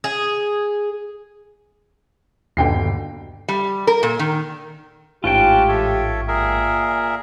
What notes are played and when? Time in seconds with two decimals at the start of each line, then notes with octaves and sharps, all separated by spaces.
0.04 G#4
2.57 G1 D#2 B2 D3 G5 C7
3.48 G3
3.87 A#4
4.03 A#2
4.19 D#3
5.24 A1 G#2 C#4 F4 G4 G5 A5 F#6
5.68 A4 C#5 E5
6.28 A#2 G#4 A#4 E5